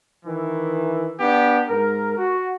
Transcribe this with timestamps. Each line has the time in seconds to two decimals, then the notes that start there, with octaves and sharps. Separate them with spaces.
0.25 D#3 E3
1.20 B3 D4 G4
1.69 G#2 A#4
2.18 F#4